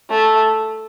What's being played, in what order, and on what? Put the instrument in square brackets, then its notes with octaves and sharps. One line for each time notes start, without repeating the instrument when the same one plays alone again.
[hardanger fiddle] A3